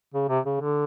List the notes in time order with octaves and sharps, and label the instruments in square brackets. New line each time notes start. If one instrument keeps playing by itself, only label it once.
[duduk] C#3
C3
C#3
D3